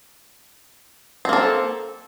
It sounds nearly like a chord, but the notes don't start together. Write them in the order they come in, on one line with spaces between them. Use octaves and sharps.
C4 A#3 A4